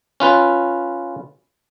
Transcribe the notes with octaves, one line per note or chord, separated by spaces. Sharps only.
C#4 F4 B4